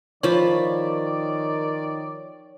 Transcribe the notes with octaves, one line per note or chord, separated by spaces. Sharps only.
D#3 F3 C#5 D5 B5